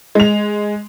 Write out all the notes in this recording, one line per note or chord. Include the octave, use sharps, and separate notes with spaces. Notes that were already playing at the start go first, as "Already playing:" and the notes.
G#3 F7